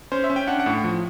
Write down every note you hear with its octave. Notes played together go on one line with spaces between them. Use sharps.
C#4 C5
E5
C#4
G5
D4 F#5
F#5
A2
F3